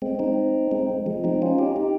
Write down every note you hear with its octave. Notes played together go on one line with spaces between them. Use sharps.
G#3 C4
C4 D#4
G#3 C4
F3 G#3
C4 D#4
C#4 F4
D#4 G4
D#4 G4